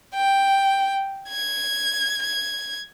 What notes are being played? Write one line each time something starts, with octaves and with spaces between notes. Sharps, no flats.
G5
G#6
G#6